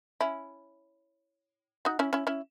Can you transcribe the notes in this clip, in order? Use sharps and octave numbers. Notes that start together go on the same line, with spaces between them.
C#4 E4
D#4 F#4
C#4 E4
C#4 E4
C#4 E4